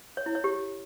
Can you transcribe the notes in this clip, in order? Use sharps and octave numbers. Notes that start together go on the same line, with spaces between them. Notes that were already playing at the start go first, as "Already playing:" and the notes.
C#5
E4
C#5
G4